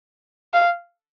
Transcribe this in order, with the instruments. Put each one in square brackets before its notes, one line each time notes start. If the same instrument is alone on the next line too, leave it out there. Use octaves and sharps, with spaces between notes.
[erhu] F5